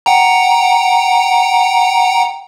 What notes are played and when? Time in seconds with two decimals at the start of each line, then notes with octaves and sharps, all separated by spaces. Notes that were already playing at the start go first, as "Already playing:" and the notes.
0.06 F#5 G5 A#5